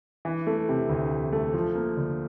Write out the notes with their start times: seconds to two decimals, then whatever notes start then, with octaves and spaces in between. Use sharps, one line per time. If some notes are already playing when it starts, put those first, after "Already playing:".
0.25 E3
0.47 A3
0.69 C3
0.89 D2
1.11 E3
1.33 A3
1.54 F3
1.75 A#3
1.97 D3